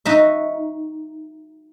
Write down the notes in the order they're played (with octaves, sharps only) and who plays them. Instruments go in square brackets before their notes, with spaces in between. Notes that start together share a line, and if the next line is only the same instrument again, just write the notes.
[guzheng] D#4 F#4 E5